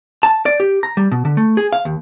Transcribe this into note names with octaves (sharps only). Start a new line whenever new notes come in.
A5
D5
G4
A#5
G3
B2
D3
A3
G#4
F5
D#2